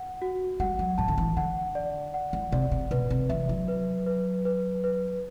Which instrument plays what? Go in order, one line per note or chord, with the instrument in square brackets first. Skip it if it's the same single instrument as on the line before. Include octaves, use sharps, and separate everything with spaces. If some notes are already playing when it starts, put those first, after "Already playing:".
Already playing: [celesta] F#5
F#4
[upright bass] G3 [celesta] F#5
[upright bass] F#3
[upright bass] A2 [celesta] A5
[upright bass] D3
E3
[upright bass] D3 [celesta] F#5
[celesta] D5
F#5
[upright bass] E3
[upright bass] C3 [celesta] D5
[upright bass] C3
[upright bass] B2 [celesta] B4
[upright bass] C3
[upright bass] E3 [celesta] E5
[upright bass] F#3
[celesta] B4
B4
B4
B4